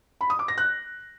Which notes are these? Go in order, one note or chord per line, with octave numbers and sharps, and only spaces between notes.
B5
D#6
D6
A#6
F#6